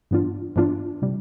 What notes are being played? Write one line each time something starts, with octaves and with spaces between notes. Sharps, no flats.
G2 E3 B3 D4 F4
G2 E3 B3 D4 F4
C3 G3